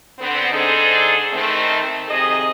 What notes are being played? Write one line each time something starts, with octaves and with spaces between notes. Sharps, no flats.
D3 B3 C4
D3 D4 D#4 G#4 A4 C5
D#3 A3 C4
F2 C3 D#3 G#4 D#5